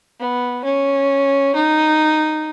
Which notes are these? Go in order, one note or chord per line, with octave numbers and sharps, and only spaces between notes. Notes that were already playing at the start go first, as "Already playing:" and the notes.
B3
C#4
D#4